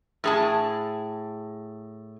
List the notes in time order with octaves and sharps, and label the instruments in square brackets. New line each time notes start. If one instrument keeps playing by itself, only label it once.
[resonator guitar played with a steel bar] A2 G#4 A5